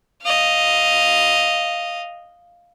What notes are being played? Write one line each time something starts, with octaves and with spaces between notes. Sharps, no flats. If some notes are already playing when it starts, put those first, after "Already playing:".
D#5 F5